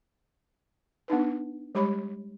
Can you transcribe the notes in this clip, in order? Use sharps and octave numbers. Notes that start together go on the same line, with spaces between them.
B3 D4 D#4 B4
G3 G#3 G4 C#5 B5